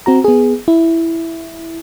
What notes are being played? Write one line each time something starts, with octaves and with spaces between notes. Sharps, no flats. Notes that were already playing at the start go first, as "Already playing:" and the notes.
C4 F#4 A#5
B3 G#4
E4